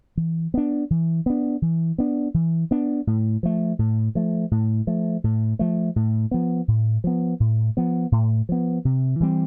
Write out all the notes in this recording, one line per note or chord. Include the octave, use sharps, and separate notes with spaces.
E3
B3 D4
E3
B3 D4
E3
B3 D4
E3
B3 D4
A2
F3 A3
A2
F3 A3
A2
F3 A3
A2
F3 A3
A2
F3 B3
A2
F3 B3
A2
F3 B3
A2
F3 B3
C3
E3 G3 C4